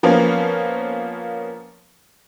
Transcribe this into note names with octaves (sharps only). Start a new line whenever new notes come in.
F3 A#3 B3 C#4